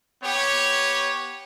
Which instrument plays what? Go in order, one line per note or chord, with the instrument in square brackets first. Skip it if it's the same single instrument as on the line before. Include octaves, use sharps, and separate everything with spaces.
[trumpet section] B3 G4 C#5